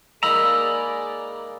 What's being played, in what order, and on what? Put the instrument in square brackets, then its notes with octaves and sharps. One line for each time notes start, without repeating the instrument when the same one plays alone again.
[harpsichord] G#3 A#3 D#4 [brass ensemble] G#4 D5 [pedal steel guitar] A#5 B5 [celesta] E6